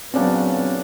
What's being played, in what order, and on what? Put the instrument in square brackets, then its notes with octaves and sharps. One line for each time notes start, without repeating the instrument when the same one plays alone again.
[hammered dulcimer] A#2 C#3 D4 [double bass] F#3 B3 [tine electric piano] C4